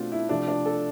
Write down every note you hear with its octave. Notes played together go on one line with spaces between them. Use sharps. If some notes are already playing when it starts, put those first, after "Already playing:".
Already playing: B2 A3 C4 D4 F4
E4
C3 F3 A3 D4
D4
A4